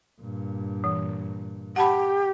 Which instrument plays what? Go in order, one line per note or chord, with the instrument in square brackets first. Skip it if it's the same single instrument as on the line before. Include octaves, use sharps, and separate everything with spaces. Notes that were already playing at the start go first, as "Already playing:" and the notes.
[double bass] G2 A#2
[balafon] E3
[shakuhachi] G4 [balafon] F#5 A5 B5